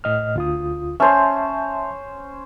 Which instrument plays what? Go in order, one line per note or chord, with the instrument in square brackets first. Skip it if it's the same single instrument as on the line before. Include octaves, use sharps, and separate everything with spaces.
[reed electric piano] A2 D#5 F6
D2 F4 D#6
[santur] C#4 C5 [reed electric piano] E5 A5 C6